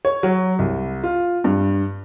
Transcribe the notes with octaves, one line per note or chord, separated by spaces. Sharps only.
C#5
F#3
C2
F4
G2